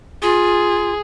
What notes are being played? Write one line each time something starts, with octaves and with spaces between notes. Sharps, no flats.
F4 G#4